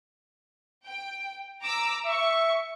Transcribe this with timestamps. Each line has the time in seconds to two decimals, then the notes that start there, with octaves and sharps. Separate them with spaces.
0.85 G5
1.62 A#5 D6 E6
2.06 E5 C#6